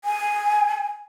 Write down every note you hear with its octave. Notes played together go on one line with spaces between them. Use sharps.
G#5